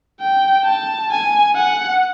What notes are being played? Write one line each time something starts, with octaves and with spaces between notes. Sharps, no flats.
G5
A5
G#5
F#5